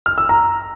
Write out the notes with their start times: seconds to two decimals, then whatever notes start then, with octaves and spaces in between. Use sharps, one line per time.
0.06 F6
0.18 E6
0.29 A#5